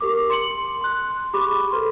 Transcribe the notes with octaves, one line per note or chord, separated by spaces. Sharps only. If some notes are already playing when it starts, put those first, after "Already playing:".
G4 A#4 D6
C6 C#7 F#7
C6 F#6
G4 G#4 B5 C#6 D6
A4 B4 C6